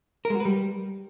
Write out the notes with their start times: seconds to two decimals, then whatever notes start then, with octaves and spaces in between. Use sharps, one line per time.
0.25 A#4
0.30 G#3
0.35 F#4
0.40 B4
0.45 G3